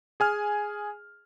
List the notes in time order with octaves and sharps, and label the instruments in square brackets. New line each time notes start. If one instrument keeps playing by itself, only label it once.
[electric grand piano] G#4 G#5 F6